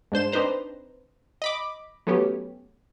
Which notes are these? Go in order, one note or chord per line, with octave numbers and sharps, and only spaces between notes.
G#2 D4 C5 E7
C4 D4 D#4 B4 C5 A#5
D#5 B5 D6
F#3 A3 B3 C#4 G4